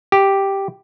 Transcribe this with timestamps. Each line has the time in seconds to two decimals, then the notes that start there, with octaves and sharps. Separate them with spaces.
0.12 G4